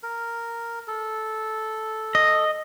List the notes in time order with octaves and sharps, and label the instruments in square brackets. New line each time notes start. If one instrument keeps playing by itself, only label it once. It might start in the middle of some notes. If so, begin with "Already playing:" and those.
[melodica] A#4
A4
[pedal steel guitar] D#5